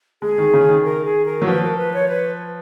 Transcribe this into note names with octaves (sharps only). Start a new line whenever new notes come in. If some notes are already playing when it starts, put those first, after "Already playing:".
G#3 G#4
D#3
C#3
D#3
A#4
G#4
A#4
F#3
F3 B4
A#4
B4
C#5
B4